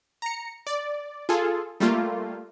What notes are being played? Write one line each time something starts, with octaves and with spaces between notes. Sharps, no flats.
A#5 C#7
D5
F4 G#4 A4
G3 A3 A#3 F4